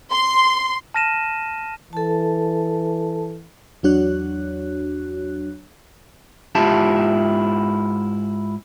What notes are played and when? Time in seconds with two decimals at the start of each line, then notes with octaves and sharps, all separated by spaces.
0.11 C6
0.94 A5 F6 A#6 D#7 E7
1.93 E3 A4 A5
3.83 E2 F#3 D4 F#4 C#5 F#6
6.55 G#2 E4 F4 G4 A5